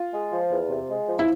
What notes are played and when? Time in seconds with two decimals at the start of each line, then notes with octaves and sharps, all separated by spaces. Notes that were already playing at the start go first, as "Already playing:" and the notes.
Already playing: F4
0.14 G#3
0.32 F3
0.51 E2
0.70 C3
0.90 G#3
1.08 F3
1.19 E4